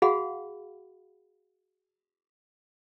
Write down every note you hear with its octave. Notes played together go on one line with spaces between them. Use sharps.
F#4 G#4 F5 F#5 B5